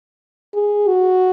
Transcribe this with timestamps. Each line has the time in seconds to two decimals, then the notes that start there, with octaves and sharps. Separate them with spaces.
0.54 G#4
0.87 F#4